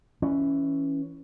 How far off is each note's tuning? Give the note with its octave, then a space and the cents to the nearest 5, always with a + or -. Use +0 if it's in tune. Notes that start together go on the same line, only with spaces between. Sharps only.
E3 +0 C#4 +0